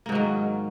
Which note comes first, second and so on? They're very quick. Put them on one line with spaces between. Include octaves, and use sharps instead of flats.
A#3 G#2 F#3 D#3